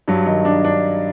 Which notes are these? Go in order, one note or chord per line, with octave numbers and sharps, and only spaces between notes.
G2 F#3
D#3 D#4
D4
D4